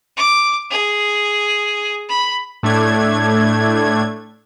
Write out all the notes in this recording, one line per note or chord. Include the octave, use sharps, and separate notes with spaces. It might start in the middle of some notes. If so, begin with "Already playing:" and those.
D6
G#4
B5
A2 A3 D4 G#6